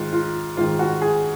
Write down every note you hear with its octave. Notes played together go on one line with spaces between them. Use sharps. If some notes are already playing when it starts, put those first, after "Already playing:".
Already playing: G#2 D#3 F4
F4
G#2 D#3 F4
F#4
G#4